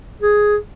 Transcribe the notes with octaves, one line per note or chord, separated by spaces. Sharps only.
G#4